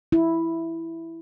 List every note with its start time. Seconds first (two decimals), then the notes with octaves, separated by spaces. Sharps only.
0.12 E4